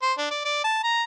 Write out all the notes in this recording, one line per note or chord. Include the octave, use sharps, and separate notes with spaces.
C5
D4
D5
D5
A5
A#5